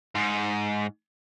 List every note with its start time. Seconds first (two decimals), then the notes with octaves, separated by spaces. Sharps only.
0.15 G#2